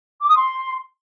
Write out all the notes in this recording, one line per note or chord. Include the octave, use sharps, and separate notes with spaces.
D6
D#6
C6